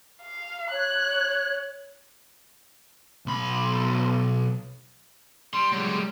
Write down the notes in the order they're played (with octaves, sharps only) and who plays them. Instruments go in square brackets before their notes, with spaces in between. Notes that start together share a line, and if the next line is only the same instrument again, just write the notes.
[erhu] F5
[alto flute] C#5 [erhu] F#6
[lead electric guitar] B1 B5
[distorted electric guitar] G3 [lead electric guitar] C6
[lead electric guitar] F#3 G#3